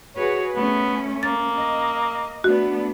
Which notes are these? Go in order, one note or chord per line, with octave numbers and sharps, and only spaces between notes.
F#4 G#4 B4 C#5
A3 B3 C#4
A#3 A6
D#5
A3 B3 D4 F#4